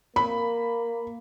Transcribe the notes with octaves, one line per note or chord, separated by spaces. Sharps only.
A#3 B5